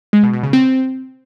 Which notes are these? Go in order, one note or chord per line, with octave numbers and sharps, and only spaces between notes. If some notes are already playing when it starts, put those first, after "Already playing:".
G#3
B2
B2
C#3
C4